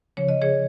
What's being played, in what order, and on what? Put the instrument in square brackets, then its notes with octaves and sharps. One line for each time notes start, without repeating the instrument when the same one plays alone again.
[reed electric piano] C#2 C#3 F3 [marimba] C#5
[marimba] D#5
G#4 C#5